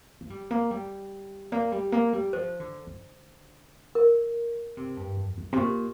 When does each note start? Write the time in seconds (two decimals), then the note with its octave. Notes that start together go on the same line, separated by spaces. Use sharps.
0.21 A#3
0.30 G3
0.51 A#3
0.71 G3
1.52 A#3 D5
1.72 G3
1.92 A#3
2.13 G3
2.33 F3 C5
2.60 D3
2.87 D3
3.95 A#4
4.77 C3
4.97 G2
5.17 F2
5.38 G2
5.52 C3
5.57 A#2 G4